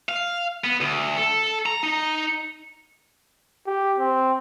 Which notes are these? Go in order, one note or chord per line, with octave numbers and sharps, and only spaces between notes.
F5
B3
D2
A4
A#5
D#4
G4
C4